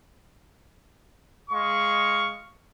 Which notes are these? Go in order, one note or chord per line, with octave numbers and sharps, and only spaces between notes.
G#3 F5 C#6